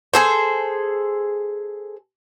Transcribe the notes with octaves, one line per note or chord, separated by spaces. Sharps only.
G#4 A4 C5